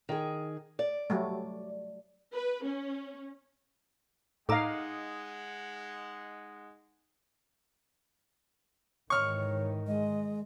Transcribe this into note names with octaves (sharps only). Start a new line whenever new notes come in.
D#3 G#4
D5
F#3 G3 A3
B4
C#4
A2 G#3 D#4 F5 F#5 A#5 D6 E6
G#2 D#3 E3 C#5 C#6 F6
G#3 D#5